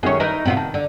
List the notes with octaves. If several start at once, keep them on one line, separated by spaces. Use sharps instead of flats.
F#2 D#3 C#4 G#4 C#5
D#4 E4 A#4 B4
A2 C3 B3 F4 F#5
D#3 A5
D3